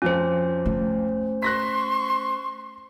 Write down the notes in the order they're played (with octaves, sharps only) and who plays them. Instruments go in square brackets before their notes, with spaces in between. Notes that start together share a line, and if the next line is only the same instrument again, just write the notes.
[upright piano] F2 F3 F4 [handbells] C#4 C5
[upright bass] A3
[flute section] C6 C#6 [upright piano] F#6 A#6 B6